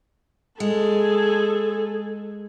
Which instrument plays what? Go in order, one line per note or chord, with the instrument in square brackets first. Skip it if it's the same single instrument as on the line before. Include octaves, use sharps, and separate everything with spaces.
[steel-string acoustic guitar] G#3 [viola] G#4 A4